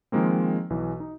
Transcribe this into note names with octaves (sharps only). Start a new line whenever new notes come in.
D#3 F3 G#3 A#3 C4
B1 E3
D#4